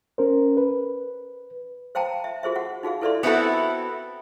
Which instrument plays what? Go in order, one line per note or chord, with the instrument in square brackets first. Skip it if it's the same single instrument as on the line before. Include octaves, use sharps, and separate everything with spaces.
[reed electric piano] C#4 A#4 C5
B4
[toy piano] C5 F5 G5 A5 A#5
E5
F#4 G#4 C5 E5
F#4 F#5
D#4 F#4 G#4 F5
E4 A4 B4 D5 E5 C6
[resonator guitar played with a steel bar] B3 C4 E4 F#4 A4